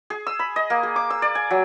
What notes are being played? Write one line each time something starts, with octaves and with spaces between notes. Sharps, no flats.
G#4
E6
B5
D#5
A#3
G#4
D6
E6
D5
G#5
F#3